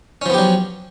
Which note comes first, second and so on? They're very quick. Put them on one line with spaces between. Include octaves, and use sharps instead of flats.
C#4 F3 B3 G4 F#3